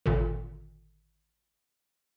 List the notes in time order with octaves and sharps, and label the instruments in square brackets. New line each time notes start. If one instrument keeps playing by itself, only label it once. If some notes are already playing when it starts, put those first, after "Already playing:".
[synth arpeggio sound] G#1 A#2 D3